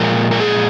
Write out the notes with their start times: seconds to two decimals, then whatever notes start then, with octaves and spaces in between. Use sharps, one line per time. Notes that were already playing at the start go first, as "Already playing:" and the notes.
Already playing: A#2 F3 G#3 A#4
0.31 A#4
0.40 G#4